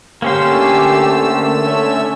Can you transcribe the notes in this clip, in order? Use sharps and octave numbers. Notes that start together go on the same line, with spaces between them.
D3 A3 A#3 C#4 G4 C5 E6
C#4 E5